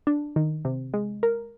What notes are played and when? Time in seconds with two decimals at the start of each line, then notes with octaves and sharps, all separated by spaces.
0.07 D4
0.36 D#3
0.65 C3
0.94 G#3
1.23 A#4